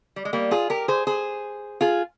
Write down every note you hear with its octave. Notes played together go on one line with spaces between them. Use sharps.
G3
G#3
G3 A#3
F4 G#4
G4 A#4
G#4 C5
G#4 C5
F4 G#4